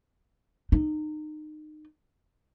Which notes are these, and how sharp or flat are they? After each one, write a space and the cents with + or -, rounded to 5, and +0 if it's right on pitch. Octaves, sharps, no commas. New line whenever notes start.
D#4 -30